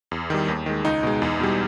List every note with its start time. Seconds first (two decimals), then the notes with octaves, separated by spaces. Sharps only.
0.11 E2
0.30 D#3 G3
0.48 D#2
0.66 D#3 G#3
0.85 C#2 D#4
1.03 B2 G#3
1.22 E2
1.40 B2 G3